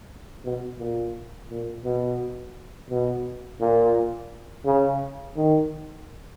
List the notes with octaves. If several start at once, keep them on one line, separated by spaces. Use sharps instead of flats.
B2
A#2
A#2
B2
B2
A#2
C#3
D#3